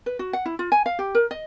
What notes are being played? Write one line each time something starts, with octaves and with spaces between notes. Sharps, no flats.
B4
F#4
F#5
E4
F4
G#5
F5
G4
A#4
D#5